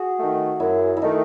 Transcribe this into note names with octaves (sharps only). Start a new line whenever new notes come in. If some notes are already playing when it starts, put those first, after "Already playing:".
Already playing: F#4 G#4
D#3 A3
F#2 E4
E4
D#3 A3 D#4